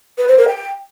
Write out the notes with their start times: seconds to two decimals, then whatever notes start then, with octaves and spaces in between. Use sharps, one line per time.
0.18 B4
0.28 C5
0.38 A#4
0.48 G5